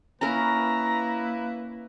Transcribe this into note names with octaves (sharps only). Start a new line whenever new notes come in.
A#3 C#4 E4 A#4 B4 A#5